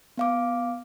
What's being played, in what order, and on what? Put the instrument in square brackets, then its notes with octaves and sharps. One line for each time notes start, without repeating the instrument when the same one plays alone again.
[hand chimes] B3 F5 D6